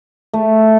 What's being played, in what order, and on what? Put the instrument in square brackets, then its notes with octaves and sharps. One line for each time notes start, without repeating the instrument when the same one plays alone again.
[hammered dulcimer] A3